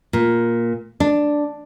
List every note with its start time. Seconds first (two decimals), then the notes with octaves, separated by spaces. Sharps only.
0.13 A#2
1.00 D4